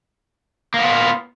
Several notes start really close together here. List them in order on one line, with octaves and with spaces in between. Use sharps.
A#3 B3 F4